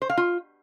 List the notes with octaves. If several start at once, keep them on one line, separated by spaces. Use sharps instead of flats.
C5
F5
F4